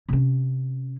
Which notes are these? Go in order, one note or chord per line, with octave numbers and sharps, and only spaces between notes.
C3 C#4